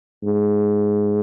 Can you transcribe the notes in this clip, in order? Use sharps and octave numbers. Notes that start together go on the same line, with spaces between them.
G#2